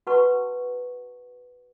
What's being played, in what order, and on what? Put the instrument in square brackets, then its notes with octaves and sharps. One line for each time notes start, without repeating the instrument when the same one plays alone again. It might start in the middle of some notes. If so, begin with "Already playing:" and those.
[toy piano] F#4 B4 F#5 A5 C#6